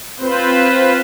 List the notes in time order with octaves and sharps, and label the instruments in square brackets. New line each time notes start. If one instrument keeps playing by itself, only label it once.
[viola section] C4 C5 [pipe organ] F4 B4